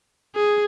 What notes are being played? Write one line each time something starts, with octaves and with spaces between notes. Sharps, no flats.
G#4